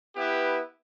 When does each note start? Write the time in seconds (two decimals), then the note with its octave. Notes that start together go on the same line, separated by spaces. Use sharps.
0.16 B3 E4 G4 B4